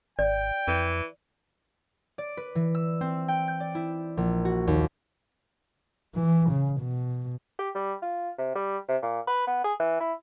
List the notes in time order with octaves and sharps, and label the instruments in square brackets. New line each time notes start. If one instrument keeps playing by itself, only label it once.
[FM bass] G#1 [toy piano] D5 [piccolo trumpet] G5
[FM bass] F2 [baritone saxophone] E3
[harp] D5
B4
E3
E6
C4
G5
G6
D5
E4
A#1
F#4
D#2
[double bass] E3
C#3
B2
[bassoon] G4
G3
F4
C3
G3
C3
A#2
B4
B3
G#4
E3
E4